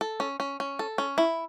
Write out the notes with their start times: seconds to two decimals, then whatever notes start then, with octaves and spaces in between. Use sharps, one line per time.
0.01 A4
0.20 C#4
0.40 C#4
0.60 C#4
0.79 A4
0.98 C#4
1.18 E4